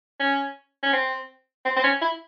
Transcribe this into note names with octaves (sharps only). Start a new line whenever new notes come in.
C#4
C#4
C4
C4
C4
C#4
E4